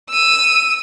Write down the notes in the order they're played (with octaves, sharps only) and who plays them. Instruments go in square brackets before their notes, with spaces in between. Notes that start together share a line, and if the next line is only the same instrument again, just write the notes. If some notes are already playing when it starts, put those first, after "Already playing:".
[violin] E6 D#7